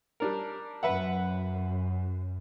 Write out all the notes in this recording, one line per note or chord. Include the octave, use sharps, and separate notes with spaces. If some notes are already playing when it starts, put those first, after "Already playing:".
G3 D4 A#4
F#2 B4 E5 F#5